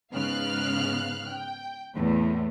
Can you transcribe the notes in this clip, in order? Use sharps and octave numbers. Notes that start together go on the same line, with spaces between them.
G#2 C#3 B3 F5 F6 F#6
G5
E2 A2